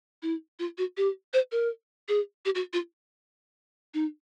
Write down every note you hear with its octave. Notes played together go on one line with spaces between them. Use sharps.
E4
F4
F#4
G4
C5
A#4
G#4
G4
F#4
F4
D#4